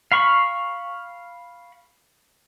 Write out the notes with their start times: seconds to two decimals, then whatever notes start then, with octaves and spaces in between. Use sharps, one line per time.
0.12 F5 B5 C#6